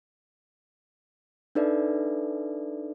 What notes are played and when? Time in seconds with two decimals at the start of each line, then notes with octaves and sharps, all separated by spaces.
1.55 D4 D#4 A4 B4 D5 E5